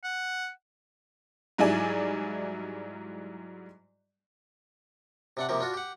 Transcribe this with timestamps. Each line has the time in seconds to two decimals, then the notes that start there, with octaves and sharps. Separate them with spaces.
0.04 F#5
1.58 G#2 F#3 G3 E4 D5 G#5
5.37 C3 D4 F#5
5.49 C3 F3 A#3 G4
5.61 D4 F4 F#4
5.74 G4 F#5